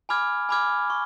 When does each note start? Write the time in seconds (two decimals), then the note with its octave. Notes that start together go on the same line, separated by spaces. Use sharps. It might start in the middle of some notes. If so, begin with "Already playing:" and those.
0.09 G#5 B5 D6 F6 G#6
0.49 G#5 B5 D6 F6 G#6
0.90 C#6